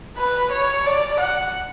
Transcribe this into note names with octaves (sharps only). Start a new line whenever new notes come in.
B4
C#5
D5
F#5